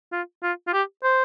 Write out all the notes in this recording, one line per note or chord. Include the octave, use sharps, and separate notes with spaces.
F4
F4
F4
G4
C5